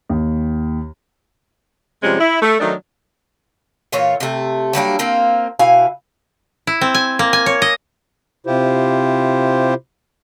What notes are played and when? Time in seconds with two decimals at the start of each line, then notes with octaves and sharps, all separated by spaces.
0.10 D#2
2.03 C3 F3 G3 G#3 C#4
2.19 E4
2.41 A3
2.60 D#3 F#3 A3 D4 D#4
3.92 A#2 E3 F4 C#5
4.20 C3 A3
4.73 F#3 G3 A#3 D4
4.99 A#3 C4 F4
5.59 B2 E4 F5 G#5
6.67 E4
6.81 C4
6.94 G#5
7.19 A#3
7.33 G#5
7.46 C#5
7.62 D#5
8.47 C3 E4 F4 G4 C5